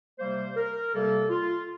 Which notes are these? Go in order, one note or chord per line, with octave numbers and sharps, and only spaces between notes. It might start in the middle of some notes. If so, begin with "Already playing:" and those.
C3 G3 A#3 C5
A#4
C3 G3 A#3 A4
F4